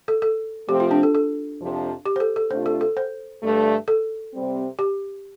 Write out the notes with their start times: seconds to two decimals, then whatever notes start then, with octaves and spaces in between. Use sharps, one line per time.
0.08 A4
0.22 A4
0.68 C3 F3 A3 C4 G4
0.80 F4
0.91 D4
1.03 A4
1.15 A4
1.59 F2 C3 F3 D4
2.06 G4
2.16 C5
2.20 A4
2.36 A4
2.51 C3 A3 D4 F4 C5
2.66 A4
2.81 A4
2.97 C5
3.42 G2 D3 A3
3.88 A4
4.33 C3 G3 C4
4.79 G4